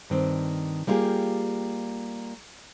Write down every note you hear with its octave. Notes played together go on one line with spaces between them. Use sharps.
G2 D#3 C4
G3 A#3 E4 F4 G4 G#4